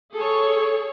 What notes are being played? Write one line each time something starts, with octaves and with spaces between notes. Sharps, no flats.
G#4 A4 C#5